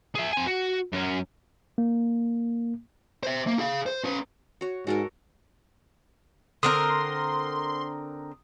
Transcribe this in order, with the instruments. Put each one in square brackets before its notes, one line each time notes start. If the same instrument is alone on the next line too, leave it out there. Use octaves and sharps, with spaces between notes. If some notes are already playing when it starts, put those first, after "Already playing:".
[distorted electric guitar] G#4 E5
C4 G#5
F#4
F#2 C#4
[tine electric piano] A#3
[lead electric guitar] C5 E5
A#3
G#4 F5
C5
C#4 B4
[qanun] F#4 C#5
[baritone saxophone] G#2 [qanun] F#4 A4 A#4
[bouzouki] D3 C4 A#4 [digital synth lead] C6 [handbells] D#6